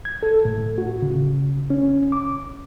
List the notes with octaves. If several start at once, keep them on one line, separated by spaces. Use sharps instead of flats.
G#6
A4
A2
F#4
C#3
C#4
D6